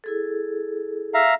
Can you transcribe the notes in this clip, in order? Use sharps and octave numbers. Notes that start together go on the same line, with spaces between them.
E4 G#4 A4
E5 F5 A#5